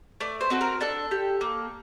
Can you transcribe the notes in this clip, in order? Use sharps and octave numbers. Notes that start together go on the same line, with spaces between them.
A3 D5
C5
C4 F#4 A4
A#4
D4 A4
G4
A#3